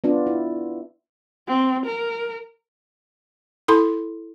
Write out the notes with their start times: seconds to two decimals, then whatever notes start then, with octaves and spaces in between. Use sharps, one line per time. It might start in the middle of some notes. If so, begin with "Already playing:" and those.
0.04 B3 D4 F4
0.27 E4
1.48 C4
1.86 A#4
3.68 E4 A4 B5 C6